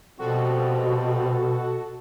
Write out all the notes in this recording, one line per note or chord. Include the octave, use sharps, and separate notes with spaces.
B2 F3 G3 C4 F#4 A4